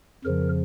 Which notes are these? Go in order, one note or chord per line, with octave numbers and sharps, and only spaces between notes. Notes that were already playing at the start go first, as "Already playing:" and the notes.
F2 C#3 F3 A#4